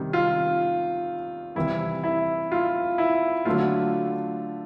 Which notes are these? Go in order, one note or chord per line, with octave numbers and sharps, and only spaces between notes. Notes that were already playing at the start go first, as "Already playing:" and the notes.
Already playing: C3 D#3 G3
F4
C3 E3 G3 E4
E4
F4
E4
D3 F#3 A3 F4